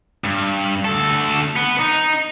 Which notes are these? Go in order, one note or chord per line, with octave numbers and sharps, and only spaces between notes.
G2
D2 A4
B3
D#4